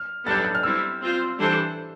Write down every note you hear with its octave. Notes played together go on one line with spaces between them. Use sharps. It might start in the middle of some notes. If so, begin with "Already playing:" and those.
Already playing: F6
G3 B3 D4 A4 A6
G6
A6
G6
F6
G3 C4 E4 E6
C4 F4 C5
E3 G3 D4 A4 C5